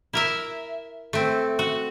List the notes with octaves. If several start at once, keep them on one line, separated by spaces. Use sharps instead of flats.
E4 A#4 E5
A3 C4
F#4